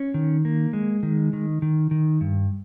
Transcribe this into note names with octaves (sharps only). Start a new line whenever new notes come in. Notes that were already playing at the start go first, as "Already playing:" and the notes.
Already playing: C#4
D#3
A#3
G#3
D#3
D#3
D#3
D#3
G2